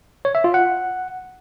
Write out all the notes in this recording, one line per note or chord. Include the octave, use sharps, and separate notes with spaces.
C#5
E5
F4
F#5